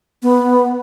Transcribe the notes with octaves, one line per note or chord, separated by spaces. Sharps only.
B3